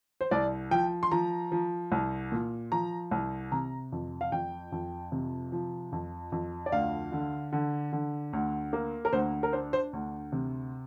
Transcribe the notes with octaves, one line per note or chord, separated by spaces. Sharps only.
C5
C2 D5
F3 G5
C6
F3 A#5
F3
C2
A#2
F3 A#5
C2
C3 A#5
F2
F5
F2 G5
F2
C3
F3
F2
F2
D5
D2 F5
D3
D3
D3
D2
A#3
A#4
D2 C5
A#4
D4 C5
C5
D2
C3